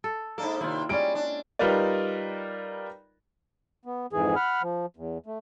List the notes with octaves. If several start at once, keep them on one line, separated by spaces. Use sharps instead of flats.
A4
G#2 A#3 D4 A4
D#2 C3 E4 F4
G3 G#3 C#4 D5 D7
D4
G3 D#4 F4 A#4 B4 D5
B3
F2 G#2 E3 G#4
F#5 B5 F6
F3
E2
A3